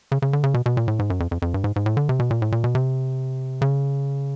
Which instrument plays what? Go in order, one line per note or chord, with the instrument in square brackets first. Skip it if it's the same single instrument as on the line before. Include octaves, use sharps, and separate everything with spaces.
[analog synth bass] C#3
C#3
D3
C#3
B2
B2
A#2
A2
G#2
F#2
F2
F2
F2
G2
G#2
G#2
A2
D3
C3
B2
A#2
A2
A#2
B2
C3
C#3